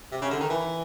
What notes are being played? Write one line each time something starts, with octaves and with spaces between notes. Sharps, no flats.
C3
C#3
D3
D#3
E3